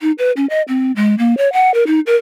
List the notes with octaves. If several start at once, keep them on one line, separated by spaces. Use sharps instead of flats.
D#4
B4
C#4
D#5
C4
G#3
A#3
C#5
F#5
A#4
D#4
A#4